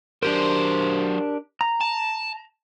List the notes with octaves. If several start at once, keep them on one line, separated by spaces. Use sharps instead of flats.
F#3 D4 G4 A#4 C5
A#5
A5